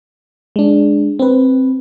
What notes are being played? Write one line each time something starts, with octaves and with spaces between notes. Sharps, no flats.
G#3 D4
C4 B4